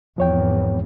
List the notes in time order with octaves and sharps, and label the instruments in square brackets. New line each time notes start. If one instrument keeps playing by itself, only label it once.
[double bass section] G#1 E2 [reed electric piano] F3 C#5 G5